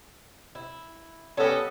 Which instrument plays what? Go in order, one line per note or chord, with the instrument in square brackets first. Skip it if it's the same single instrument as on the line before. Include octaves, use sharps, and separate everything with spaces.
[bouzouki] E4
[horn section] G3 B3 A4 [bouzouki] C#4 D#5